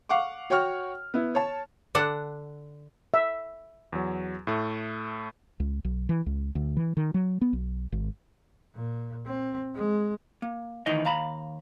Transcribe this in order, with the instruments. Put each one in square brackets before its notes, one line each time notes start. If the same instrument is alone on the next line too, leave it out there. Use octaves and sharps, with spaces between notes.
[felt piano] F5 F#5 C#6 D6
F#4 C#5 F#5 G5 C#6 F6
B3 E4
C#5 A5
[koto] D3 D4 F#5
[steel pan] E5
[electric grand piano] E2 F#3
A2 A3
[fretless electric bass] C#2
B1
E3
C#2
D2
E3
D#3
F#3
B3
B1
G#1
[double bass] A#2
C4
G#3
[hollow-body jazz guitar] A#3
D2 D#3 E3 D#4 D#5
D#2 F5 A#5 B5